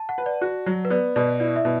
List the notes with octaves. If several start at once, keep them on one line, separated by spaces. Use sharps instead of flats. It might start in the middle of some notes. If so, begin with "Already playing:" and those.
Already playing: A5
F#5
B4
D5
F#4
F#3
B4
B3 D5
B2 D5
E4 D5
E5
B2